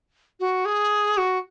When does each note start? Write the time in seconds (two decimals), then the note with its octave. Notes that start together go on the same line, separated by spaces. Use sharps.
0.40 F#4
0.65 G#4
1.17 F#4